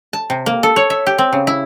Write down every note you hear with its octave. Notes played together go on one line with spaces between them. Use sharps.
A5
C3
A#3
A4
C#5
E5
G4
C4
C#3
E4